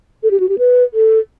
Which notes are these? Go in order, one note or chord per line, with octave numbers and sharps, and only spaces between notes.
A4
G4
F#4
G4
B4
A4